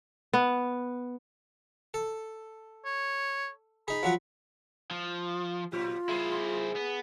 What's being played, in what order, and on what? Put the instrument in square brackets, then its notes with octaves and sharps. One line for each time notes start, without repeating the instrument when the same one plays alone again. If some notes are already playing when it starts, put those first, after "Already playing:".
[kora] B3
[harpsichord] A4
[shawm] C#5
[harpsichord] D#4 G#4 [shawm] B5
[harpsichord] F3 F#3 F#4
[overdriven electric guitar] F3
[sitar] A#2 F#3 G4 [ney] F4
[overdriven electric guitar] E4 C5 [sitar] G#4
[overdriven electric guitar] B3